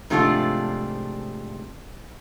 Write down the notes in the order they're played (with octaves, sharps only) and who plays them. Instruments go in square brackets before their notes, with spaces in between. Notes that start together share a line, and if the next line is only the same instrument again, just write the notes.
[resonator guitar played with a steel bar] G#2 C3 F3 A3 D4 F4